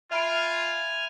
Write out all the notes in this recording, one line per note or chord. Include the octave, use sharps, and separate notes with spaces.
F4 E5 G#5 B5 F6 D7